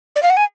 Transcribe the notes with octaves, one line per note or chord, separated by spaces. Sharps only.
D5
F5
F#5
G#5